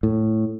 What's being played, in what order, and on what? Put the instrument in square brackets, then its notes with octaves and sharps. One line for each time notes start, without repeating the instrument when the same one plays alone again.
[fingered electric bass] A2